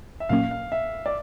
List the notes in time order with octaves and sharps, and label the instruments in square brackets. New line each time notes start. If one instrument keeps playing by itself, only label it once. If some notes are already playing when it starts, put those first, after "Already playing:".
[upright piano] E5
[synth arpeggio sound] A#2 F#3 A#3 C#4 [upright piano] F5
[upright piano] F5
E5
D5